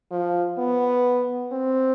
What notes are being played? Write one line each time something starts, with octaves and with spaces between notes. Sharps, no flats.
F3
B3
C4